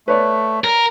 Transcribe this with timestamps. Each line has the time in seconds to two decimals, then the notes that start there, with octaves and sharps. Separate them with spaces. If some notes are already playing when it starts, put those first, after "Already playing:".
0.08 A3 B4 C#5 D5
0.64 A#4